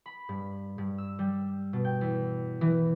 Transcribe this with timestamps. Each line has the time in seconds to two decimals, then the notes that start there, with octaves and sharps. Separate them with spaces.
0.06 B5
0.29 G2
0.78 G2
0.98 E6
1.19 G3
1.73 B2
1.85 G5
2.01 E2
2.61 E3